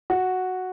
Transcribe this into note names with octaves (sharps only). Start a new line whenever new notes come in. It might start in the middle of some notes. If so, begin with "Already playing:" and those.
F#4